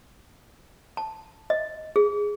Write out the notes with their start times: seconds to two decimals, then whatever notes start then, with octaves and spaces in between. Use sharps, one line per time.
0.97 A5
1.50 D#5
1.96 G#4